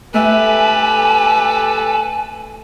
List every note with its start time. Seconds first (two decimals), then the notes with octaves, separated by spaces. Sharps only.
0.14 A3 G4 A4 B4 E5 G#5